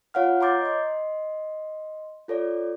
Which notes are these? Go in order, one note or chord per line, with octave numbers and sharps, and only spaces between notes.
F4 C#5 F5 F#5 F6
C#5 A#5 C6 D6 G6 A6
D#5 C6
F4 A4 C#5 D5